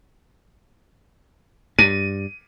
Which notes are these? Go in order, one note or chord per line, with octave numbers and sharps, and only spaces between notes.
G2 D#7